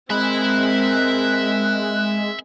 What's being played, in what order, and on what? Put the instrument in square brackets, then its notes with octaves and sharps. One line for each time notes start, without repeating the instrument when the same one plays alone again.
[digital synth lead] G#3 [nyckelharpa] C4 A#4 [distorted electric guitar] E5 B5 [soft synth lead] F#6